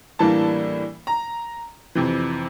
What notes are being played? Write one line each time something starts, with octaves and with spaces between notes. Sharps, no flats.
A2 E3 G3 A#3 D4 A5
A#5
F2 C3 E3